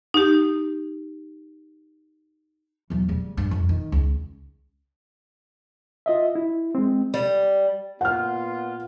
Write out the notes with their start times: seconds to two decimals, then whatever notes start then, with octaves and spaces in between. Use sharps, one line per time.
0.14 D#4 G4
2.90 E2 F#3
3.08 C#3 G3
3.37 G2
3.51 F2
3.69 D#3
3.92 C#2
6.06 F4 D#5 E5
6.35 E4
6.75 G#3 C4
7.14 G3
8.01 A#2 B3 F4 F#5 F6